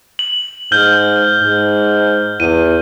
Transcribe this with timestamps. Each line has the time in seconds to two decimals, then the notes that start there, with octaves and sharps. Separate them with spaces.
0.19 F#7
0.72 G#2 F6 G6 G7
1.42 G#2
2.40 E2 D#7